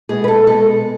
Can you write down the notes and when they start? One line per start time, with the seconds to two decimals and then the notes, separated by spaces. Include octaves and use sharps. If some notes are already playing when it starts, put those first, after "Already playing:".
0.09 B2 G#3 B3 G#4
0.24 B4
0.28 A4
0.47 B2 G#3 B3 A4